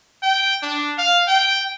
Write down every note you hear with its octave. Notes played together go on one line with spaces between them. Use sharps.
G5
D4
F5
G5